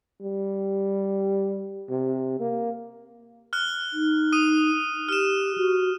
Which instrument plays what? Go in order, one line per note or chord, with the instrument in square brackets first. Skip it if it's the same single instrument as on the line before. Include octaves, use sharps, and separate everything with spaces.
[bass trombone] G3
C3
A#3
[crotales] F6 F#6 G7
[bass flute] D#4
[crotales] D#6 D#7
[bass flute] G4 [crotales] F6 E7
[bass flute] F#4